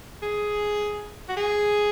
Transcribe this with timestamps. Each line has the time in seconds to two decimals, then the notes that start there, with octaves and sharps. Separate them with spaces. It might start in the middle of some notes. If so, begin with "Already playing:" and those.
0.23 G#4
1.29 F#4
1.37 G#4